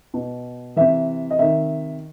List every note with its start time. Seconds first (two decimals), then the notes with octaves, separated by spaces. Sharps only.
0.14 B2
0.76 C3 E3 E5
1.31 D#5
1.39 C3 D#3 E5